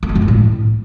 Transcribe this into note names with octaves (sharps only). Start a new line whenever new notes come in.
A3
G#3
F#2
D#3
A2